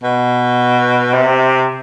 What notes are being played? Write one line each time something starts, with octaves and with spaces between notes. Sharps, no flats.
B2
C3